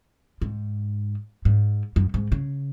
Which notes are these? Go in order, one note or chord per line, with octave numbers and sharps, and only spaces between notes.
G#2
G#2
F#2
G#2
C#3